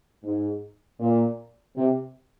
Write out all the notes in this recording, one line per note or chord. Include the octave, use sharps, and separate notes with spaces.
G#2
A#2
C3